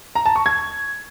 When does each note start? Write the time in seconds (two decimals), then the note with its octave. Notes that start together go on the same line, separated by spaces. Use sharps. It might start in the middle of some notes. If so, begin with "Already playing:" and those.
0.15 A#5
0.26 A5
0.36 C#6
0.46 G#6